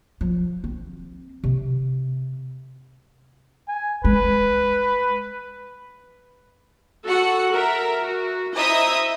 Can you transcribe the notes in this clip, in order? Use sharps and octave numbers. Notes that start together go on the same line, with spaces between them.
F3
C4
C3
G#5
G#3 B4
F#4 A4 F#5
A#4 E5
F#4
E4 C5 D#5 E5 A#5 D#6